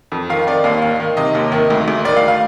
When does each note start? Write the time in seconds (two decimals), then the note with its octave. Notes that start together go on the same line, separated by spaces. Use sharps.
0.12 F2
0.29 D#3 F5
0.47 D#3 D5
0.64 D#2 F5
0.82 D#3 F5
1.00 D#3
1.17 C3 D#5
1.35 D#2
1.52 D#3
1.70 D2
1.88 D2
2.05 D#3 D5
2.16 F5
2.28 F5